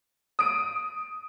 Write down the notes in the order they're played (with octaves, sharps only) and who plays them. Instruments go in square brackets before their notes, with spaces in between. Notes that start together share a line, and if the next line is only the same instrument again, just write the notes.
[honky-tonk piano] D#6 D7